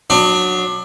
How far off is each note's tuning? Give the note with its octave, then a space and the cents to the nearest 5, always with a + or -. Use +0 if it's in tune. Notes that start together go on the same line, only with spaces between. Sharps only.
F#3 -15 D4 +25